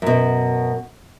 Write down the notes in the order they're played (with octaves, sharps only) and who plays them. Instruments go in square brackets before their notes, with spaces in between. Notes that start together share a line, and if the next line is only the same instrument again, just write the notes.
[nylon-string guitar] F#2 B2